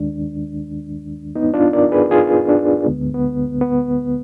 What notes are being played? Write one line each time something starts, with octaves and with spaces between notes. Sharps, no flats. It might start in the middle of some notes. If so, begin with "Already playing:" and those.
Already playing: D#2 D#3 G#3 D4
B3 D#4
D4 F4
A#4 D5
G#4 B4
F4 G#4
D4
D2 D3 G#3 B3
B3
B3